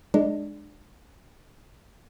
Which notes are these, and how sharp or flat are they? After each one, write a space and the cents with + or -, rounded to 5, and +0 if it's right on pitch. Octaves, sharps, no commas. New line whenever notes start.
G#3 +10 D4 +20 D5 +0